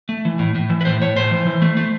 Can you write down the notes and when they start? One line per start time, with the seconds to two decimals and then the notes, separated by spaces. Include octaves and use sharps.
0.09 A3
0.25 E3
0.39 A2
0.55 A2
0.70 E3
0.81 B4
0.85 A2 C5
1.01 A2 C#5
1.16 A2 C5
1.31 E3
1.47 E3
1.62 A3
1.77 A3